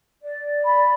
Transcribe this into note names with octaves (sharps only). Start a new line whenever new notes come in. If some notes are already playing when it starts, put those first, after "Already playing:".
D5
B5